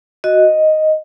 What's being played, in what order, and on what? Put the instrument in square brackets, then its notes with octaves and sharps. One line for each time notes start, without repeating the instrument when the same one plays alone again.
[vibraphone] F#4 D#5